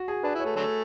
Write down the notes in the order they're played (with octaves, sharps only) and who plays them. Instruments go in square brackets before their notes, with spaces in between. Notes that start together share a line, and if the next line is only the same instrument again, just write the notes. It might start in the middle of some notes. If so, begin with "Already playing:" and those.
Already playing: [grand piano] F#4
G#4
[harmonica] D4 [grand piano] B4
[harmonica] E4
[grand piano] C#5
[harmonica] A3
D3 F#3 A3